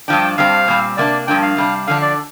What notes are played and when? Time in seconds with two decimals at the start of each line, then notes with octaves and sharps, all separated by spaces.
0.08 G2 F3 D4 G5
0.38 G2 G3 C4 F5
0.68 A#2 G3 C4
0.97 C3 A#3 D4 D5
1.27 G2 F3 A#3 D4 G5
1.43 F5
1.57 C3 G3 D4
1.87 D3 F3 D4 F5
2.02 D5